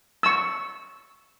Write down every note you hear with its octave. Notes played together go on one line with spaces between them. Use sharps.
C#6 E6